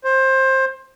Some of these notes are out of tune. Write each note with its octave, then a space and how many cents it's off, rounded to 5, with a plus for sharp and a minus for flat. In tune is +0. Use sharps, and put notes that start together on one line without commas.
C5 +20